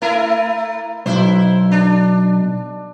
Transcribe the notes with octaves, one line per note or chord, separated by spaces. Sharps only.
A3 E4 A#4
B1 E4 C5
D4